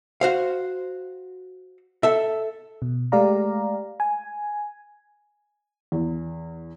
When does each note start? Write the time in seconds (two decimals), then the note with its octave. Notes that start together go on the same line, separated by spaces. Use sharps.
0.21 F#4 C5 F5
2.03 A4 E5
2.82 B2
3.12 G#3 A3 G4 D5 F5 A#5
4.00 G#5
5.92 E2